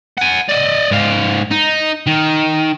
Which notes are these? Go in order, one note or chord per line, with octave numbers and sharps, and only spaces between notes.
F#5 G#5
D5 D#5
G#2 F5
D#4
D#3